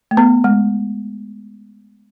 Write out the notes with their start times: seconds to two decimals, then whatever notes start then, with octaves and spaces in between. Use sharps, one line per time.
0.11 A3
0.17 B3
0.44 G#3